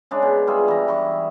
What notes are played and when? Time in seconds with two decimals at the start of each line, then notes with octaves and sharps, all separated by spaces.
0.11 C#3 G#3 D4
0.22 B2
0.47 G3 F4 G#4 E5
0.68 E3 A#5
0.88 E3 C#6